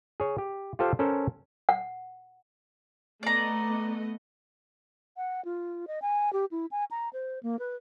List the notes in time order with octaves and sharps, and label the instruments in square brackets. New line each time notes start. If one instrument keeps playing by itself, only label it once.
[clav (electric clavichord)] G#4 C#5
G4
F4 G4 A4 C5 F5
C#4 A4 A#4 C5
[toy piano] F#5
[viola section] A3 B3 D#5 [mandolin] D5 A#5
[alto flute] F#5
F4
D#5
G#5
G4
E4
G#5
A#5
C5
A#3
B4